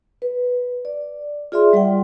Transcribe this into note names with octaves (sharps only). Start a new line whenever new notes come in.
B4
D5
F4 G#4 D5 E5 C6
G3 D5 F#5 G5